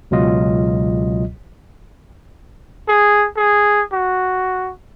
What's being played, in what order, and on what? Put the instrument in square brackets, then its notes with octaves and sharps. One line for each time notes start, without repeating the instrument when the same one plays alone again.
[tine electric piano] C#2 B2 F#3 F4 D#5
[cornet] G#4
G#4
F#4